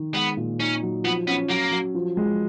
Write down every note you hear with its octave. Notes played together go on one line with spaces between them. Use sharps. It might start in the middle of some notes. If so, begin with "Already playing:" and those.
Already playing: D#3
G#3 B3
A#2
C#4 D#4
F#3
F3 B3
B3 C#4
F#3 A#3
F#3
F3
G#3